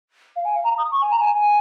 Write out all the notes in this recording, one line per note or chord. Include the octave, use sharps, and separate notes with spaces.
F5
G#5
F5
A#5
D#6
C#6
G#5
A#5
G#5
G#5